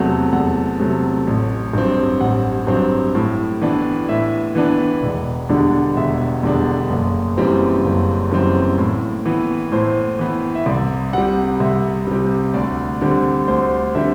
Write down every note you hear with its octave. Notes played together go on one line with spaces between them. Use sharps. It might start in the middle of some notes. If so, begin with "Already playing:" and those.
Already playing: E2 C3 F#3 A3 F#5
E2 F#5
C3 F#3 A3
A1
G2 F#3 C4
A1 F#5
G2 F#3 C4
A2
E3 B3 D4
A2 E5
E3 B3 D4
E1
E2 D3 G3 D4
E1 E5
E2 D3 G3 D4
F#1
F#2 E3 G3 C4
F#1
F#2 E3 G3 C4
A2
E3 B3
A2 C5
E3 B3
E5
C2 D5
C3 G3 F#5
C2 E5
C3 G3
D2 D5
D3 G3 C4
D2 C5
D3 G3 C4 E5